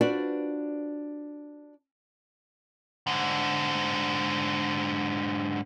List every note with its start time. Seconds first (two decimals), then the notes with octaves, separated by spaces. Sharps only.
0.01 D4 F4 F#4 B4 C5 D5
3.07 G#2 D3